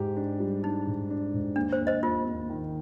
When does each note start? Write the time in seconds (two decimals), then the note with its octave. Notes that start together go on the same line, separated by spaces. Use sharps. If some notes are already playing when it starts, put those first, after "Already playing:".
Already playing: G#2 G4
0.17 D4
0.40 G3
0.63 D4 D#4
0.87 G#2
1.10 D4
1.34 G#2
1.56 D#2 D4
1.73 C5
1.79 D#2
1.87 C5 D#5
2.03 D#2 F4
2.26 D#2
2.50 D#3